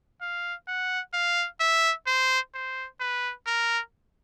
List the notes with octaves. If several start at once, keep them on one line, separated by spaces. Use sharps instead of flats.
F5
F#5
F5
E5
C5
C5
B4
A#4